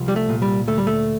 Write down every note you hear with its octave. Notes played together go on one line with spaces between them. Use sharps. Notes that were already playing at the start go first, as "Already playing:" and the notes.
Already playing: C2 F3
G3
A3
A#2
G3
D2 A3
G3
A3